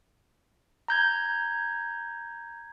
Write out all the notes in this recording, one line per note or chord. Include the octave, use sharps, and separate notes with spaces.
A#5 G6 G#6